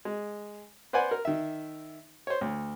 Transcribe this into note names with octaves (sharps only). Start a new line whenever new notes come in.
G#3
B4 C5 D5 F#5 G#5
A#4
D#3 E5
C5 C#5
D2